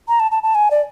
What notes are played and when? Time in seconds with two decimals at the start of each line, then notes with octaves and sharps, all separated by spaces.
0.08 A#5
0.20 A5
0.31 A5
0.43 A5
0.55 G#5
0.71 D5